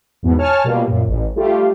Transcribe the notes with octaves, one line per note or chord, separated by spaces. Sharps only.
E2 G#2 B2
C#5 G#5 A5 F6
B2 G3 A#3 F4
F#2 A#2
A1
G3 A3 F4 G4